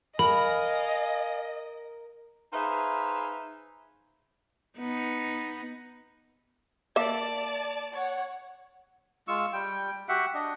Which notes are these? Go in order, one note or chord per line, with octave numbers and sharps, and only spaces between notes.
A#4 D#5 F5 G#5 B5
D#4 G#4 B4 C5 E5 F5
B3 D#4
A#3 D5 E5 A5
C#5 F#5
G#3 F4 C#6 E6
G3 G5
F#4 G4 E5 F#5
D4 D#5